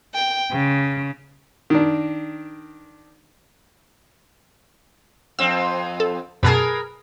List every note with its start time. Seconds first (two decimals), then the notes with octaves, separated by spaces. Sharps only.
0.14 G5
0.50 C#3
1.70 D#3 D4
5.39 F2 C4 E6
6.00 A4
6.43 F#2 B2 G#4 A#4 B4 A5